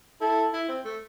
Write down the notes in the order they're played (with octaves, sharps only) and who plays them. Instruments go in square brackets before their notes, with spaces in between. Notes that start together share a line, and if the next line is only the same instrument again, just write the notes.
[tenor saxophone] E4 [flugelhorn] A4
[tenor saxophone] E4
C4
A3